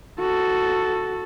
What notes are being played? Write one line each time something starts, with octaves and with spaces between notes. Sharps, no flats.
F#4 A4